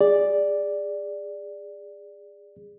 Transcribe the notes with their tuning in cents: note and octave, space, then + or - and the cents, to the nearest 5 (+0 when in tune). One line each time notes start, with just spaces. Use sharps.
G#4 -20 D5 +0